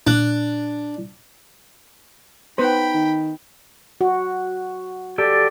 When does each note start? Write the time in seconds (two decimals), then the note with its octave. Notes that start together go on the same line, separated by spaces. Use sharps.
0.07 A#2 D4 F#6
2.58 B3 D#4 B4 C5 G5 B5
2.94 D#3
4.01 F#4
5.18 G4 A4 D5